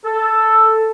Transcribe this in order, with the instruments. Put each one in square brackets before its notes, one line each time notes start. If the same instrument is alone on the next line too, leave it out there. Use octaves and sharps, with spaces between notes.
[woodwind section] A4